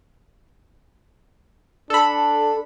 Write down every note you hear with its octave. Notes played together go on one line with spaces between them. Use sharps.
D4 A4 B5